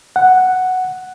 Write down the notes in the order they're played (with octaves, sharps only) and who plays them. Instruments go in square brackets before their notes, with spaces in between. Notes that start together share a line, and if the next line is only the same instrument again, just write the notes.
[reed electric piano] F#5